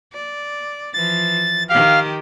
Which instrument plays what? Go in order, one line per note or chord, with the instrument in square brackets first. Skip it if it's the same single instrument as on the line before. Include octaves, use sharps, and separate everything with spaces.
[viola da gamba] D5
[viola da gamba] E3 F3 [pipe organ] A6
[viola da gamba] D#3 G4 [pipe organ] F5